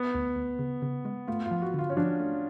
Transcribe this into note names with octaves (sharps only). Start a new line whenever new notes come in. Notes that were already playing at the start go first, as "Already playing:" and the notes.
Already playing: B3
D2
D2
C#3
C#3
G#3
A3 F4
F4
F3
F#4
D3 F4
C#4
F3 D4
A3